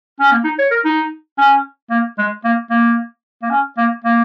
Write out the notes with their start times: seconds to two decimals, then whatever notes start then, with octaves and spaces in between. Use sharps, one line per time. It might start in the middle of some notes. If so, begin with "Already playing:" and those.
0.20 C#4
0.32 A#3
0.44 D#4
0.59 C#5
0.71 A#4
0.85 D#4
1.38 C#4
1.90 A#3
2.18 G#3
2.44 A#3
2.70 A#3
3.42 A#3
3.50 C#4
3.77 A#3
4.04 A#3